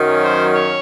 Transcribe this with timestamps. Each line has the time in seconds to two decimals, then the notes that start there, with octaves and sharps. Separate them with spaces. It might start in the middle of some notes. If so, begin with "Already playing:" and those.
Already playing: F#2 D#3 F#3 C#4
0.21 C5
0.51 C#5